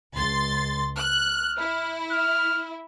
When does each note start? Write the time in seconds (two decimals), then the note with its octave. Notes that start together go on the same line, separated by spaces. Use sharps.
0.15 C#2 C6 A6
0.99 F6 F#6
1.59 E4
2.12 F6